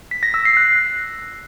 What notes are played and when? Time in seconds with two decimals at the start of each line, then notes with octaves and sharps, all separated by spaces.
0.11 B6
0.23 A#6
0.34 E6
0.45 C7
0.57 F#6